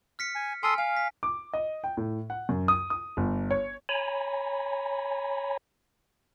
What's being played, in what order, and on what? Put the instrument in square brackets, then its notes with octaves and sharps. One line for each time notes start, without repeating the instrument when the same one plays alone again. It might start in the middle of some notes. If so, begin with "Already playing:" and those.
[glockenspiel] F6 B6 C#7
[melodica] G#5
[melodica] A4 C6 D#6 [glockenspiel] G#5 F6
[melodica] F5 [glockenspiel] G#5
[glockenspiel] B6
[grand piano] D6
D#5
G5
A2
F#5
F#2
D#6
D#6
G1
C#5
[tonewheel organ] C#5 G#5 A#5 B5